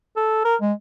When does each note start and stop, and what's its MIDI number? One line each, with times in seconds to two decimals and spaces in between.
0.16 0.43 69
0.45 0.56 70
0.61 0.73 56